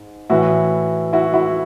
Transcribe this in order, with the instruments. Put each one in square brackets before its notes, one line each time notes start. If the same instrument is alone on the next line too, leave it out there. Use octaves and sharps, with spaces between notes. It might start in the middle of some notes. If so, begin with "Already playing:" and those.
Already playing: [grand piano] G#2
A2 E3 E4 F#4
E4 F#4
E4 F#4